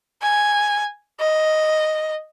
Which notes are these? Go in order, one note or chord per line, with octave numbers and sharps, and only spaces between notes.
G#5
D#5